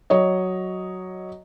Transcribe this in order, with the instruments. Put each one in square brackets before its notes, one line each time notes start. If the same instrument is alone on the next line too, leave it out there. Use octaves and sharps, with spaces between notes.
[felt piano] F#3 C#5 D#5